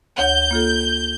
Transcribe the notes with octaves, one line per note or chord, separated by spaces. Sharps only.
D2 C#5 F#5 G6
A#3 F4 A4